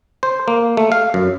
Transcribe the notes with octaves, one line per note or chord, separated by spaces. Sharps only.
C5
A#3
A3
F5
F#2